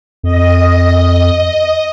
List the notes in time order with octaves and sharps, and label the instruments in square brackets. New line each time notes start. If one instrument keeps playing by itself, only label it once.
[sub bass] F2 [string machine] D#5